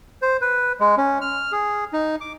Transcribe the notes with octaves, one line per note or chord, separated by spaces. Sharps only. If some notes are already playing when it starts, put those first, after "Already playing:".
C5
B4
G#3
C#4
F6
G#4
D#4
D6